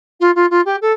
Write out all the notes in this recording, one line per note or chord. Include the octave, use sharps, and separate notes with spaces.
F4
F4
F4
G4
A4